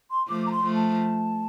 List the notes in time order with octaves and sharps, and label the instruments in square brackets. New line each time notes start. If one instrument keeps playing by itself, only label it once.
[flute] C6
[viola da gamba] F3 A3 [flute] D6
[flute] A#5
C6
[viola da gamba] F3 A3
[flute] A5